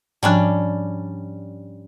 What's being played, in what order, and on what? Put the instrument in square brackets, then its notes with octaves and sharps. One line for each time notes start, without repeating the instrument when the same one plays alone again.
[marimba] G#2 F3 [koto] G3 C#4 D4